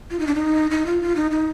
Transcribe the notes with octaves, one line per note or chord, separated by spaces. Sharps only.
F4
D#4
D4
D#4
D#4
F4
F4
D#4
D#4